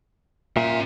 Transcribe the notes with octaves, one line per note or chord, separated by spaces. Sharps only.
A#2 C#4 E5